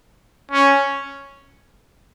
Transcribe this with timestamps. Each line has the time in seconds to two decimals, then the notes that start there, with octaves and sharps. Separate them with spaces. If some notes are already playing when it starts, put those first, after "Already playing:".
0.51 C#4